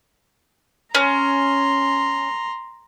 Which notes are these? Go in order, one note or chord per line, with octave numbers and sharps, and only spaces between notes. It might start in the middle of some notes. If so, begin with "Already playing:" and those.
C#4 A#5 C6